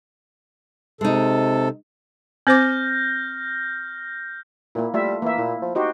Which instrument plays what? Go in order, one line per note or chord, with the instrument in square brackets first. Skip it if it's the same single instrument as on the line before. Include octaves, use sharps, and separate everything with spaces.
[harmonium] C3 A4 [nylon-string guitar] G#3 D#4
[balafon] C4 C5 D6 [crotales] F6 G6 A#6
[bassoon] A#2 [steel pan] A#3 E4
[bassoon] G3 [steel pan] A3 F4 E5
[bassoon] E3 [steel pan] A#3 E5
[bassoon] A#2 [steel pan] E4
[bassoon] F3
[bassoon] D#4 [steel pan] F#4 G4 C5